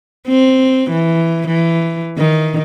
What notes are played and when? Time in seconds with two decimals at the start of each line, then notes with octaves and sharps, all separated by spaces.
0.28 C4
0.91 E3
1.48 E3
2.18 D#3